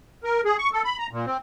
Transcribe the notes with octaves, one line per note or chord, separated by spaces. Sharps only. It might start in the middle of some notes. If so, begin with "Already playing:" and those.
A#4
G#4
C#6
A4
B5
A#5
A#2
C4